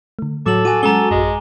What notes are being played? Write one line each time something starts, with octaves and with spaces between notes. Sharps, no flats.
D3 A3
A2 F#3 A4 D6 F#7
F#4 G#5 D6 D#7
F#3 G#3 C#4 A4 A#5 G7
A1 F#2 G#3